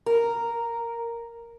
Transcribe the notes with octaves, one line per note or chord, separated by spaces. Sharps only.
A#4